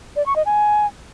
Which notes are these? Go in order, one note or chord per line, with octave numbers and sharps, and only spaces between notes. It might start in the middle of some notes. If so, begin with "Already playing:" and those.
D5
C#6
D#5
G#5